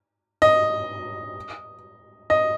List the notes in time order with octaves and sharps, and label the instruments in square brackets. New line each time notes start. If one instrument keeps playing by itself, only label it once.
[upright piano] D#5
D#5